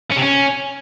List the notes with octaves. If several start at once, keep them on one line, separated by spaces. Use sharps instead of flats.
C#4
C3
C#4